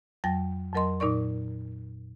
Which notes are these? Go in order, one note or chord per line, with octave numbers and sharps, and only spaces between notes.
F2 F#3 G5 A#6
F2 F#3 A#4 D#5 C6
A#2 D#4 A#4 D5 C#6